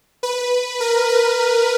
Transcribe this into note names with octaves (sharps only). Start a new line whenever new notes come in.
B4
A#4
B4